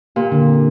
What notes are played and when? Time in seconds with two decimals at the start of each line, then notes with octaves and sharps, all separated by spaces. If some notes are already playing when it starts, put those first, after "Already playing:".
0.16 A#2 G4
0.32 D3
0.47 C4